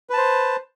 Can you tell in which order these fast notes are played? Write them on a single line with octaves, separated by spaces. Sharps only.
B4 A5 C5